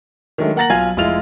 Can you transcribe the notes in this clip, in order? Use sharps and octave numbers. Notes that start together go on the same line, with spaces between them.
D#3 F#3 G#3 A3 D4
A#3 F#5 A#5 A6 A#6 F#7
B1 F4 F5 G#5 G#6
F1 G#3 E4 F4 F7